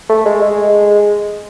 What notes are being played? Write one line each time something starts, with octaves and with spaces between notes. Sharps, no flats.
A3
G#3
G#3